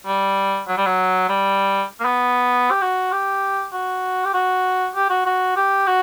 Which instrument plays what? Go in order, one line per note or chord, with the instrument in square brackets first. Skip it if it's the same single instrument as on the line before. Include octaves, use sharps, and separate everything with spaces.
[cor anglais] G3
F#3
G3
F#3
G3
A#3
B3
G4
F#4
G4
F#4
G4
F#4
G4
F#4
F#4
G4
F#4